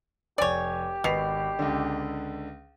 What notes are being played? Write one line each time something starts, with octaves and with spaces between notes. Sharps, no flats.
F1 G4 C#5 D5 G#5 A6
G#1 B2 C7 F7
C#2 D3